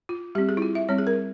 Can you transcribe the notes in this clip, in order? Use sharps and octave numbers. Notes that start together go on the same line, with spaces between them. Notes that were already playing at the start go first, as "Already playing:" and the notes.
F4
G3 C4 G4
G#4
E4
F4
E5
G3 C4 C#5
G#4
A#4